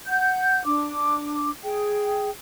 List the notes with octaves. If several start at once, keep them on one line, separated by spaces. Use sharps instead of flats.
F#5 G6
D4 D6
G#4 G5